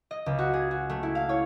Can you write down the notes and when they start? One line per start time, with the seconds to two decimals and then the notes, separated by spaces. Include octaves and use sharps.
0.11 D#5
0.26 C#2
0.39 F#4
0.54 G#4
0.71 F#4
0.90 A3
1.03 E4
1.15 F5
1.29 C#5